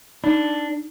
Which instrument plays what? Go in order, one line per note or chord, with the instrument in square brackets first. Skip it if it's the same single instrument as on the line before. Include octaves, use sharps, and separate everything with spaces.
[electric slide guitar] D4 [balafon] D#4